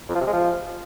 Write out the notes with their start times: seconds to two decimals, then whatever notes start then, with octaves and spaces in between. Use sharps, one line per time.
0.09 F2
0.15 F3
0.21 C3
0.27 G#3
0.33 F3